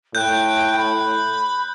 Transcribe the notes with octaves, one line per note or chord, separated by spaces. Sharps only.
A2 G5 F#6 G6
B5